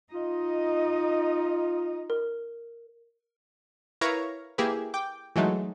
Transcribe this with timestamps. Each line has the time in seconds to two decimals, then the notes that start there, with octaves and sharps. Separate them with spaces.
0.13 D#4 F4 D#5
2.10 A#4
4.01 E4 A#4 B4 C#5 F5 A#5
4.58 A#3 E4 G4 G#4 B4
4.94 G5 D6
5.36 E3 F#3 G#3 A3 D#4